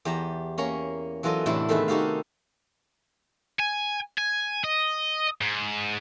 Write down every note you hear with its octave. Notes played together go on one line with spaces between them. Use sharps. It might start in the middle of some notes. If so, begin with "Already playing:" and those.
E2 G4 A5 A#5
A#3 C#4 C#5 A#5
E3 F#3 F4 A4 D#5
E2 A2 C3 D4 E4 A4
C3 D#3 A3 B3 G#4 B4
D#4 F#4 G4 A4 F5
G#5
G#5
D#5
G#2